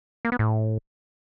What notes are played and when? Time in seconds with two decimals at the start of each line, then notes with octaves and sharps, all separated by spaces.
0.25 A#3
0.32 B3
0.39 A2